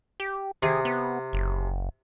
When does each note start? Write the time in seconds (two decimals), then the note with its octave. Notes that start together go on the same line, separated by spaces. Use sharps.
0.20 G4
0.63 C3 G#4
0.85 B3
1.33 F#1